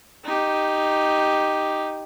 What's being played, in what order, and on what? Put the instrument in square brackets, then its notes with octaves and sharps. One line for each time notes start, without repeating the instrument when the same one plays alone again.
[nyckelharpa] D#4 G4